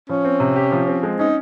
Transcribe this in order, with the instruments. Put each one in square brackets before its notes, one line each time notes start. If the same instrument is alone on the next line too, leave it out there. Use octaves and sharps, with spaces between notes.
[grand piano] F3 [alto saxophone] C#4
[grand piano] C4
C3
G4
F3
C4
G#3
[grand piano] C#4 [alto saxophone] D#4